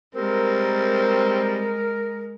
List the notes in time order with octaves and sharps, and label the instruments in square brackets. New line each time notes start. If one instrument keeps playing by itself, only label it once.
[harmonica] G3 C4 [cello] G#3 [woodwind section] A#4